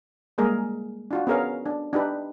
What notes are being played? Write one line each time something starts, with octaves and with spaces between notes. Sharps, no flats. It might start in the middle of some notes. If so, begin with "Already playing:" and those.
G3 G#3 A#3 G#4 A#4
D4 F4 F#4
B3 C#4 G#4 A#4 C#5 F5
D4
D4 D#4 G4 B4